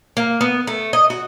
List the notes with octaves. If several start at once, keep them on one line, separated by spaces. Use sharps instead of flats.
A#3
B3
A3
D#5
F#4